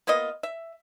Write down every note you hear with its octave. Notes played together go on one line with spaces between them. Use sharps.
A#3 B3 F4 D#5
E5